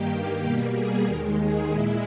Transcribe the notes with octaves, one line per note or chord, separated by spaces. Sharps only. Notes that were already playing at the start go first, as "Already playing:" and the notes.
Already playing: G2 D#3 A#3 G4
B2 G3 A#3 G4
G#4
D#2 D#3 G#3 A#4
G#4
A#2 G#3 E4